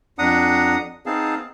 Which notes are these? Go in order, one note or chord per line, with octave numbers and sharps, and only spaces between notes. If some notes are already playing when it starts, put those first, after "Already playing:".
F2 D4 F#5 A#5 D#6
B3 C4 D#4 G#4 F5 A5